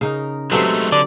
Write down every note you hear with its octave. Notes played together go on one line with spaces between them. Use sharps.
C#3 D#4 A#4
F#3 G#3 A3 C4 G4 A4 B4
D3 D5